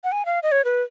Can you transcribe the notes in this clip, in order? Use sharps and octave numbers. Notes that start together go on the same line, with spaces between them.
F#5
G#5
F5
D#5
C#5
B4